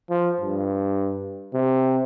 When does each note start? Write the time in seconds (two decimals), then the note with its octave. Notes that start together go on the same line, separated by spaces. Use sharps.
0.10 F3
0.41 G2
1.54 C3